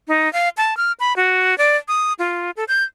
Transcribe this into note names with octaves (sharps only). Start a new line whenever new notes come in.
D#4
F5
A5
F6
B5
F#4
D5
D#6
F4
A4
G6